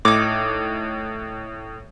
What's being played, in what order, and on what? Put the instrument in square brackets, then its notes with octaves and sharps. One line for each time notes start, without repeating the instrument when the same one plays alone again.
[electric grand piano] A2 [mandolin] D#4 D6